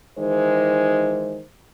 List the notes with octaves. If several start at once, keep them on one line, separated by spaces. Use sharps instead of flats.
D#3 E3 G#3 D#4 C5